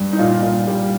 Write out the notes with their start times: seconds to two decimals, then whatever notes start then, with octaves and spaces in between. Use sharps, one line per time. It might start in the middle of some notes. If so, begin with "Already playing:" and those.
Already playing: G2
0.13 D#4
0.18 A#2 F4
0.42 A#2
0.67 G3